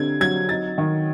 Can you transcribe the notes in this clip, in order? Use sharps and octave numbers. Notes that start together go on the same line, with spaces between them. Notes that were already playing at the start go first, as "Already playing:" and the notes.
Already playing: D3 G3 C4 G#6
F#3 G#6
D#4 A6
D#3